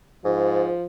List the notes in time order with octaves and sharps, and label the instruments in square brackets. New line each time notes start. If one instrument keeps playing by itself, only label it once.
[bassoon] G#2 [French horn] F3